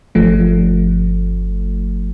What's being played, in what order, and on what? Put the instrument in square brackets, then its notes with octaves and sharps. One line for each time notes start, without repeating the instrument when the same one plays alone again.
[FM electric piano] G1 F3 A3